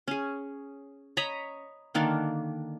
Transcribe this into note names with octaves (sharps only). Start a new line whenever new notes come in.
C#4 G#4
C#5 D#5 A#5 B5
D3 D#3 A#3 D4